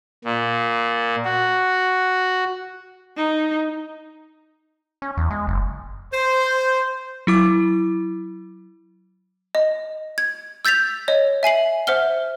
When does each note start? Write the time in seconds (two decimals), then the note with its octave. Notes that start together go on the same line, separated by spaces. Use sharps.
0.25 A#2
1.25 F#4
3.17 D#4
5.02 C#4
5.17 E2
5.30 G#3
5.47 F#1
6.13 C5
7.27 F#3 E4 D6
9.55 D#5
10.18 G#6
10.65 E6 G6 A6 B6 F7
11.08 C#5 D#5
11.43 E5 G#5 C7 F#7
11.87 C5 E5 F#5 F6 G7